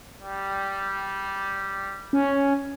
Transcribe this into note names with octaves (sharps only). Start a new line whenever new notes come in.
G3
C#4